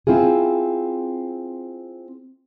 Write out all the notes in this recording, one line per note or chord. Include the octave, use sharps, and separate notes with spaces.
C4 E4 F4 G#4